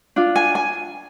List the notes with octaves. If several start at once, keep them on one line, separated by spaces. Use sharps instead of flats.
D4 F4
G#5
G#5